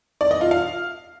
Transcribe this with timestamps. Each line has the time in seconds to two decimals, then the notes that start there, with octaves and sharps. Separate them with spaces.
0.21 D5
0.31 D#5
0.41 F4
0.51 F5